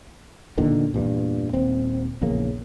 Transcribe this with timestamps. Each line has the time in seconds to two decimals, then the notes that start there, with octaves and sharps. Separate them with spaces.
0.58 E2 A#2 D3 D#3
0.94 E2 G2 A#2
1.53 D#1 C4
2.21 A#1 E2 C#3 A#3